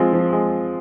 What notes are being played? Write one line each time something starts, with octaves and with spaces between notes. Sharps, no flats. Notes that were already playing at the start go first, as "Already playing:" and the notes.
Already playing: F3 G#3 C4 F4
F3
G#3